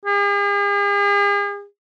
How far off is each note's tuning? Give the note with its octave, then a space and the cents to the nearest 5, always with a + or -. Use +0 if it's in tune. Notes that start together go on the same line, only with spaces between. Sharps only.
G#4 -45